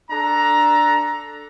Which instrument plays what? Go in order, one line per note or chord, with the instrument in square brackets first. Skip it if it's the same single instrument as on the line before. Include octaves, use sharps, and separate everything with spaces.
[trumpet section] D4 A4 A#5